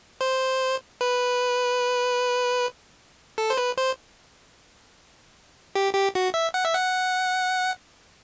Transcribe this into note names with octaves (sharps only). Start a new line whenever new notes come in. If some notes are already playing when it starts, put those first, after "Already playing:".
C5
B4
A4
C5
B4
C5
G4
G4
F#4
E5
F#5
E5
F#5